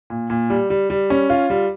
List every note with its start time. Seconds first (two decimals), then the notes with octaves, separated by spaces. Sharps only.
0.10 A#2
0.30 A#2
0.50 G3
0.70 G3
0.90 G3
1.10 C#4
1.30 F4
1.50 G3